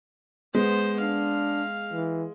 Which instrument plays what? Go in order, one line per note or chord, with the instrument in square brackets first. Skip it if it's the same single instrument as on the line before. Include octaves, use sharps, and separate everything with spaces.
[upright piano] G#3 [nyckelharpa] B3 C5
[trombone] D4 [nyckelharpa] F5
[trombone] E3